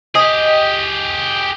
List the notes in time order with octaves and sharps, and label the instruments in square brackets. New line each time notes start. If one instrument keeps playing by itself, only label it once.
[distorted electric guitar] G4 G#4 [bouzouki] D#5